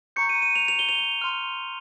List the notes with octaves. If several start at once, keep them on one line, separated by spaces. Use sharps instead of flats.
A#5 C#6 G6 C#7
D#7
D#7
F7
F7
G7
F7
C6 F6